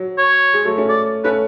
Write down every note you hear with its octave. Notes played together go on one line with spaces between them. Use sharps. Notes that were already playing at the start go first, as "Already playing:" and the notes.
Already playing: F#3
C#5
G#3
F#3 A3
A3 C#4
D5
A3 C#4 B4